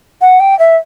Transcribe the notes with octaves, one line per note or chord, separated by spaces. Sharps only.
F#5
G5
E5